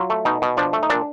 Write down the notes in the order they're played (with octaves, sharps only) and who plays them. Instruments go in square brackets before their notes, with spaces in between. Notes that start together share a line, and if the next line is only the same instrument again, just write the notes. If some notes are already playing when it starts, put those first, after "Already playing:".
Already playing: [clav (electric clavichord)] F#3 F4
A3
B2 D#4
B2
F3 D4
A3
D#4
A#2 D4